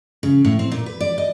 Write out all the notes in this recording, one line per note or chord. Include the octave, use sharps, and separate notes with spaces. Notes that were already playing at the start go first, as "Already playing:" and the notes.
C#3
A2
C4
A#2
B4
D5
D#5